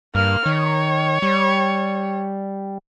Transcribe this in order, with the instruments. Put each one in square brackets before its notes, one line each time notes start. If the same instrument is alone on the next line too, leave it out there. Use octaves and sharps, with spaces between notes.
[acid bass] G2 [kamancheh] A#3 F6
[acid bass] D#3 [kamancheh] C#5
[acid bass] G3